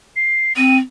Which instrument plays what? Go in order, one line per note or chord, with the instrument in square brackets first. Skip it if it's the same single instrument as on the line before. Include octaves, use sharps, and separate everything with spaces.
[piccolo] C7
[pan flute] C4 [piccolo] D#7